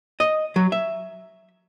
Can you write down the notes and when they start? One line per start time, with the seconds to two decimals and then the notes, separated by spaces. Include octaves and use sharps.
0.20 D#5
0.56 F#3
0.72 E5